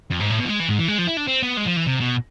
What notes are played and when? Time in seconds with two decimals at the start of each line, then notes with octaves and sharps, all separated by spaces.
0.10 F2
0.20 G#2
0.30 A2
0.39 B2
0.45 F3
0.49 G#3
0.60 E3
0.69 G#2
0.79 E3
0.88 G#3
0.99 F3
1.07 E4
1.17 D4
1.28 C4
1.42 B3
1.57 G#3
1.66 F3
1.77 E3
1.87 C3
2.01 B2